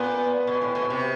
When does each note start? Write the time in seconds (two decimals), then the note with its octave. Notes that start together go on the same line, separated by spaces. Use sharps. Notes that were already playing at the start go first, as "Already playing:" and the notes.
Already playing: A#2 B3
0.47 B2
0.62 A2
0.75 B2
0.90 C3